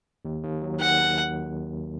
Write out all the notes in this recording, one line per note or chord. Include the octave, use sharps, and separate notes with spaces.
D#2
D#2
F#3
D#3 F#5